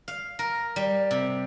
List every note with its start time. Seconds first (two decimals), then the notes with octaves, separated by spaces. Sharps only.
0.08 F5
0.39 A#4
0.76 G3
1.11 C3